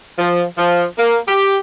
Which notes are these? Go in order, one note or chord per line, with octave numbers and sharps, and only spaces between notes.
F3
F3
A#3
G4